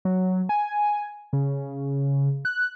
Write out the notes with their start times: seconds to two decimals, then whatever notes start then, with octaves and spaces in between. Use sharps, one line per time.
0.05 F#3
0.49 G#5
1.33 C#3
2.45 F#6